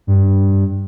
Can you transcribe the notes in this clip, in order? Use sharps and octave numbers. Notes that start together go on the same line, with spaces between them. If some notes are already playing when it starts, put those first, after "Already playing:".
G2